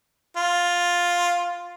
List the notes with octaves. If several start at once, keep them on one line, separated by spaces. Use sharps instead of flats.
F4